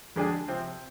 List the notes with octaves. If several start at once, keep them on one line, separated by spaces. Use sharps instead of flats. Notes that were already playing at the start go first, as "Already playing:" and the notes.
F2 D3 G#3 D4 G#4
C3 F3 C4